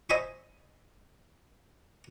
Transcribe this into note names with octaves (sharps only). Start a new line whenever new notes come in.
C5 D#5 E5 G#5 B5 C#6